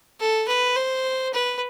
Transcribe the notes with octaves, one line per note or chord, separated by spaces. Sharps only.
A4
B4
C5
B4